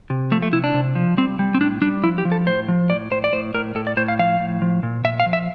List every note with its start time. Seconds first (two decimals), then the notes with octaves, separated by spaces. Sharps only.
0.10 C3
0.31 F3 A3
0.42 A3
0.52 C3 E4
0.64 D4
0.74 C3
0.95 F3
1.17 G3 C4
1.39 G3
1.54 C4
1.61 A2 D4
1.82 G3 D4
2.03 F3 E4
2.18 G4
2.25 F3
2.32 A4
2.46 A2 C5
2.68 F3
2.90 A2 D5
3.11 A2 C5
3.24 D5
3.33 A2 C5
3.54 A2 A#4
3.75 A2 A4
3.87 D5
3.97 A2 C5
4.08 F5
4.19 F3 F5
4.40 A2
4.62 F3
4.83 A#2
5.04 A#2 E5
5.20 F5
5.26 F3
5.33 E5